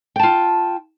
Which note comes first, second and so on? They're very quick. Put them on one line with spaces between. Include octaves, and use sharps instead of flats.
G5 A5 F4